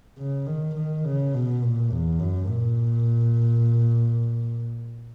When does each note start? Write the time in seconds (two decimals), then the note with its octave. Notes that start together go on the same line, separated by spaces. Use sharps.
0.18 C#3
0.47 D#3
0.76 D#3
1.04 C#3
1.34 B2
1.63 A#2
1.91 E2
2.19 F#2
2.49 A#2